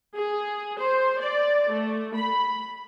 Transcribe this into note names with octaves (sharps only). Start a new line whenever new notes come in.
G#4
C5
D5
A3
B5